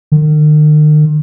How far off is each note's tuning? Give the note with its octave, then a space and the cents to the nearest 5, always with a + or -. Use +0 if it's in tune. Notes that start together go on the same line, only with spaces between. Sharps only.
D#3 -45